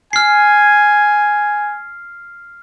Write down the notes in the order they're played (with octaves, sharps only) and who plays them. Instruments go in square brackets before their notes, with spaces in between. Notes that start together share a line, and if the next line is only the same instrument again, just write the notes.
[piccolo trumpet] G#5 [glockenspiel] F6 C7